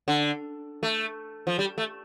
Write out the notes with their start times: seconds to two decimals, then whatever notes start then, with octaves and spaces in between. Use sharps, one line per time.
0.08 D3
0.83 A3
1.47 F3
1.59 G3
1.78 A3